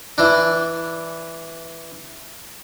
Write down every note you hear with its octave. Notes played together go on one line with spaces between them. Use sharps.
E3 D4